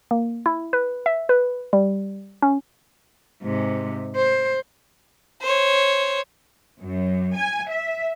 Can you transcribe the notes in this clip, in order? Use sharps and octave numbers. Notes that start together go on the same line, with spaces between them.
A#3
E4
B4
E5
B4
G3
C#4
G#2 C3
C5
C5 C#5
F#2
G#5
E5